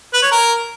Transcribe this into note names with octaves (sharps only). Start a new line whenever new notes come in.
B4
C#5
A#4